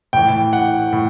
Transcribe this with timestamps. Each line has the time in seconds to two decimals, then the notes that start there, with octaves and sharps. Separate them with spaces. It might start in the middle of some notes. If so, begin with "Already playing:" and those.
0.13 A2 E3 G5
0.53 F#5
0.93 A2